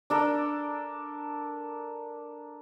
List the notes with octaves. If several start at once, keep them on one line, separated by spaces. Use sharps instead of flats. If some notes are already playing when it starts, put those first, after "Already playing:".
D4 A4 A#4